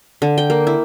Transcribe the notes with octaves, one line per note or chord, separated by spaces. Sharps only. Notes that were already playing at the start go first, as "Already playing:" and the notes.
D3
G5
A#3
E4